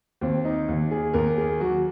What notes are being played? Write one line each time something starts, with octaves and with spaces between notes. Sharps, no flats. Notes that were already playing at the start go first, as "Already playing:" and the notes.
D#2 C4
D#4
D#2
G#4
D#2 A#4
G#4
F#3 F#4